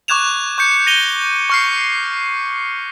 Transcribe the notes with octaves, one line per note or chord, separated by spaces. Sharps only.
C#6 D6 F#6 G#6 E7 F7
C#6 G6 C#7
A#6 D#7 F7 G7
C#6 F6 C7